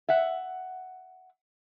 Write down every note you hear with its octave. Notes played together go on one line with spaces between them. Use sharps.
E5 F#5